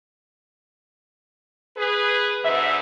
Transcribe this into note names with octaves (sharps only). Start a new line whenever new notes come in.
G#4 B4
G#2 B2 D3 E5